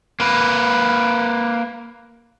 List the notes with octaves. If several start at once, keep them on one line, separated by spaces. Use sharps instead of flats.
A#3 B4